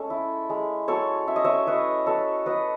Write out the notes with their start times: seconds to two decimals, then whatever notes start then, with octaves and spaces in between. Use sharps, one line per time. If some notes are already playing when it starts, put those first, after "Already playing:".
Already playing: G#3 C#4 A4
0.10 E4
0.50 G#3
0.88 F#3 A4 C#5
1.27 C#4 E5
1.36 D#5
1.45 C#5 E5
1.67 E4 B4 D#5
2.06 F#3 A4 C#5
2.46 F#3 B4 D#5